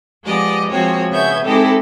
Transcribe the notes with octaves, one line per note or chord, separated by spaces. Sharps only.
F3 G#3 B3 G4 D5 D#5
F3 G#3 A#3 C4 F#4 C#5
C#3 B3 C#5 E5 G6 G#6
G#3 C4 D#4 E4 G4 A4